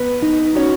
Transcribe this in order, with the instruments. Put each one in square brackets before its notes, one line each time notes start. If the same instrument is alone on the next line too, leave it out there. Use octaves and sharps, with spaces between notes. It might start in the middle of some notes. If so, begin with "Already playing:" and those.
Already playing: [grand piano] B3 [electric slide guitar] B4
[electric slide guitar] D#4
[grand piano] C#4 [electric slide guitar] F#4